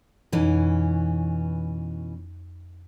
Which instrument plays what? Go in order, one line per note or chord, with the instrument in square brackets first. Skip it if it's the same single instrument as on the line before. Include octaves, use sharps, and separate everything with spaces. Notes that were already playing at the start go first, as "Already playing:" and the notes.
[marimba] F2 D#4 [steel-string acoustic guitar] B2 E3 C#4